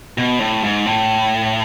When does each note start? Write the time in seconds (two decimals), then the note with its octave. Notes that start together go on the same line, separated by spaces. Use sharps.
0.18 B2
0.40 A2
0.63 G#2
0.86 A2